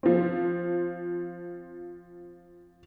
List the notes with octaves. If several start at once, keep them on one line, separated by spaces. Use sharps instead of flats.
F3 C4